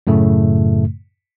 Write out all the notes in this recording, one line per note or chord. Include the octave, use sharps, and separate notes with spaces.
F#2 A2 C#3 A3